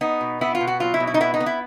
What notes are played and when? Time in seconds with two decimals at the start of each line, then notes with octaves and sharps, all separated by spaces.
0.01 B3 D#4
0.21 B2
0.41 B3 E4
0.55 F4
0.61 B2
0.67 F#4
0.80 F#3 F4
0.94 E4
1.00 B2
1.07 E4
1.14 D#4
1.20 B3 E4
1.34 D#4
1.40 B3
1.46 E4